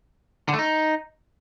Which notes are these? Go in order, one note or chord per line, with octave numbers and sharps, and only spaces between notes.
D3
A3
D#4